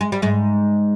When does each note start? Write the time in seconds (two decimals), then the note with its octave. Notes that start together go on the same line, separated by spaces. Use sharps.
0.01 G#3
0.12 G3
0.22 G#2 G#3